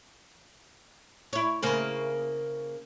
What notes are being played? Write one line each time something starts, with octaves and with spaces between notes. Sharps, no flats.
E4 C#5
C#3 A#3 C4